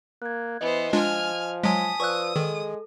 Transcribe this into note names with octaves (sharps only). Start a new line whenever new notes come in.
A#3 F#6 G#6
E3 B3 C5 D#5
F3 G#3 D4 F4 G#5 F6
F#3 G#3 G#5 A5 D#6 B6
F3 B4 D5 C#6 E6 F#6
D#3 G#3 A4